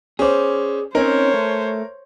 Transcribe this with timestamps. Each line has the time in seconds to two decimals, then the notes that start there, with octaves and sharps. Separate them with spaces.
0.19 C#4 G#4 C5 D5
0.95 C4 C#4 D#4 A#4 C5 C#5
1.34 A3